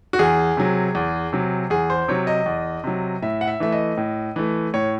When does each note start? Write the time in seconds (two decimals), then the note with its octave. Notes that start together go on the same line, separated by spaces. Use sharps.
0.13 F#4
0.19 E2 G#4
0.57 C3 F#3
0.95 E2
1.33 C3 F#3
1.70 E2 G#4
1.90 C5
2.08 C3 F#3 C#5
2.27 D#5
2.46 E2
2.84 C3 F#3
3.22 A2 E5
3.41 F#5
3.47 E5
3.60 E3 A3 E5
3.72 D#5
3.97 A2
4.36 E3 A3
4.74 A2 C#5